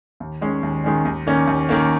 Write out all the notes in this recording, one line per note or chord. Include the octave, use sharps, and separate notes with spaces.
D#2
D#3 G#3 C#4
D#2
D#3 G#3 C#4
D#2
D#3 A#3 C#4
D#2
D#3 A#3 C#4